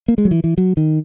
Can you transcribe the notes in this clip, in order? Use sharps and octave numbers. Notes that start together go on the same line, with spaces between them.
A#3
G#3
F#3
E3
E3
F#3
D#3